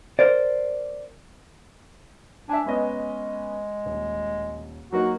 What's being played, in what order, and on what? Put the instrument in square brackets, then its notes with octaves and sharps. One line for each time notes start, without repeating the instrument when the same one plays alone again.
[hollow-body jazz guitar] A#4 C5 D5
[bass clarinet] D4 [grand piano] E5 G#5
[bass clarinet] G#3 [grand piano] B3 C#4 D#5
[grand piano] D#1
[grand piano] F#3 A#3 D#4 [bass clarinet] F#4